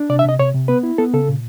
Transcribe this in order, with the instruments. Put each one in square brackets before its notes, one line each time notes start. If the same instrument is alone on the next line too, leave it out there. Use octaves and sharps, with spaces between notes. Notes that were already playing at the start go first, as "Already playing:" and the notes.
Already playing: [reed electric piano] D4
C3 D5
E5
C3 D#5
C3 C#5
C3
B3 B4
E4
B3 A4
C#3 A4
A#2